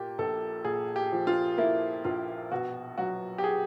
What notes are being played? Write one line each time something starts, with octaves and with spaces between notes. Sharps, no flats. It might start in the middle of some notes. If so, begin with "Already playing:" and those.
Already playing: A#2 A#3 G4
A#1 A4
A#2 G#4
G4
F3
F4
A#3 E4
A#1 F4
B2 F#4
F#3 F#4
G4
G#4